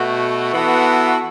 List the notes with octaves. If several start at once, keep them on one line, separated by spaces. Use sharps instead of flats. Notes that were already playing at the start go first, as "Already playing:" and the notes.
Already playing: B2 A3 F#4
E3 B3 F#4 A4